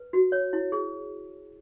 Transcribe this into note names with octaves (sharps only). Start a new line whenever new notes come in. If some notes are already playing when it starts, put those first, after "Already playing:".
Already playing: B4
F#4
C#5
E4
G#4